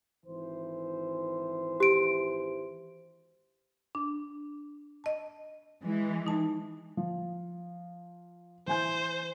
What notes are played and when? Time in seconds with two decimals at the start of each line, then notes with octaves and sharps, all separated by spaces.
0.25 G#1 E3 C5
1.80 G4 D7
3.95 D4
5.04 D#5 A5
5.84 E3 G#3
6.27 D#4 A5
6.97 F3
8.67 E3 C5 G#5 G6